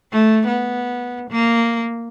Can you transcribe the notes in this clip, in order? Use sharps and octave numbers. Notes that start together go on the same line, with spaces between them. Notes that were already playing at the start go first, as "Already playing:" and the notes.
A3
B3
A#3